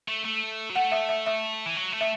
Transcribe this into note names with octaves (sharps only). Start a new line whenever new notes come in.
A3
A3
F#3
A3 F#5
E5
E5
E5
E3
F#3
A3
E5